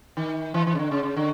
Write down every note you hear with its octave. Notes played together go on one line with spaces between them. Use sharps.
D#3
E3
E3
C#3
D3
C#3
C#3
D3